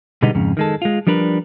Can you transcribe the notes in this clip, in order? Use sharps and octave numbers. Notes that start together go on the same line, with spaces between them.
B2 D3 G3 G#3 B3 D#4
F2 G#2 C#3
D#3 G#3 A4
G#3 F4
F3 G3 D4 A#4 B4